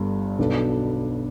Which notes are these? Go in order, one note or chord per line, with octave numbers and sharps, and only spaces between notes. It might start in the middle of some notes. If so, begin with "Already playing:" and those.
Already playing: G1 G2 D3
B1 B2 B3 D4 A4